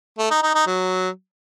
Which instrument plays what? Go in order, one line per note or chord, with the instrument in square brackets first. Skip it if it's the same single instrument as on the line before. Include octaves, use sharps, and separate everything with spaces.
[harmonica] A3
D#4
D#4
D#4
F#3